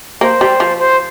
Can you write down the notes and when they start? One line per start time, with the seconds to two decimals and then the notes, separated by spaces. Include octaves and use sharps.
0.21 A#3 C5
0.41 G3
0.60 F3
0.79 C5